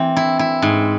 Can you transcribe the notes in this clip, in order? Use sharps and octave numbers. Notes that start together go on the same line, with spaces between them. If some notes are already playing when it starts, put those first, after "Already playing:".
Already playing: E3 C4
E4
E4
G#2